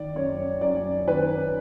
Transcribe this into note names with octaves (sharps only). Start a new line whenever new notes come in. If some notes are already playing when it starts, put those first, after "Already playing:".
Already playing: D#3 D5
F#2 C#5
F#2 D5
D#3 B4